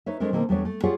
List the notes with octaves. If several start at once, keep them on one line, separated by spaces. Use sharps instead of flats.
D#4 B4 C#5 E5
G#3 A3 C4 D4 A#4
B2 D#3 A#3 C4 A4
E2 G3 A3 B3 D4 C#5
A3
F4 G4 G#4 C#5 D5 F#5